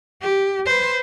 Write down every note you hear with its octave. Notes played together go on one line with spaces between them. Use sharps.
G4
B4 C5